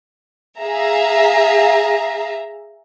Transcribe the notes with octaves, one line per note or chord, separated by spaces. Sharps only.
G#4 E5 F5 A#5